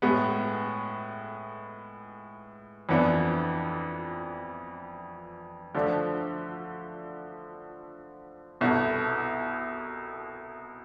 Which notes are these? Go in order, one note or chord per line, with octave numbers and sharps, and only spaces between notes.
A2 G#3 B3
F2 E3 B3 D4
D3 F3 A3 D4
C2 B2 B3 E4 A4